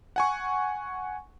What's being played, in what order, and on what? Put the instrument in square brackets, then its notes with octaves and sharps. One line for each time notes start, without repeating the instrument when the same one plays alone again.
[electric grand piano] F#5 G#5 C#6